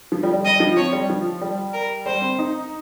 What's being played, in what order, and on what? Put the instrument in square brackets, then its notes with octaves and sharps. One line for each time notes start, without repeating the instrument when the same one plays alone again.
[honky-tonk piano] F3
G3
G3
[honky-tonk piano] G3 [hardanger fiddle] D#5
[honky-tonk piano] F3
[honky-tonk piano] C4 [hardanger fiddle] C#5
[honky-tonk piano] G3
F3
G3
[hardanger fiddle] A#4
[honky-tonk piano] G3 [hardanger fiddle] C5
[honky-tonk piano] C4
D#4